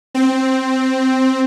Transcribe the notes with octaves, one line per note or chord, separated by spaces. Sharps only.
C4